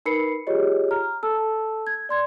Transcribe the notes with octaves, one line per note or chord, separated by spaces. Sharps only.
D#4 A#4 B4 B5 C7 C#7
F4 G4 G#4 C#5 D#5
A#5 F6
A4 A5 E6
G#6
D5 C6 G#6